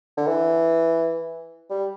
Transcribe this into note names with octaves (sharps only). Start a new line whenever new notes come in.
D3
E3
G3